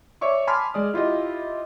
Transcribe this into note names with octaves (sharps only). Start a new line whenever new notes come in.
C#5 D5 E5 C#6 D6
G#5 A5 B5 C6 D6 F6
G#3 D5 D#6
E4 F4 G4 D#5